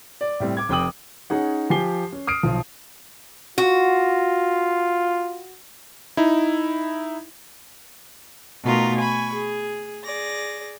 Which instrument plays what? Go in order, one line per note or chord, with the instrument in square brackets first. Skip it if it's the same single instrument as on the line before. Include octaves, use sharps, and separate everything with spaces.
[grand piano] D5
A2 G3 C4
D6 G#6
F1 C4 G5 D6 D#6 F#7
C#4 D#4 G#4 F#5
F3 G4 G#5 C7 G7
C#4
D#6 F6 C7 D7
B1 F3
[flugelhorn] F4 [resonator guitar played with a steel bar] F#4
[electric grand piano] D#4 E4
[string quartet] B2 A3 D#4 F4 A#4
G#5 B5 C#6
G#4
G#4 D5 A#6